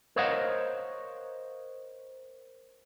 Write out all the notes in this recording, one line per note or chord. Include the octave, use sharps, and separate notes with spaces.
A#4 C5 C#5 D#5 F5 F#5